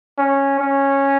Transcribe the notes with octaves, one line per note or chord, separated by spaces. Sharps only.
C#4
C#4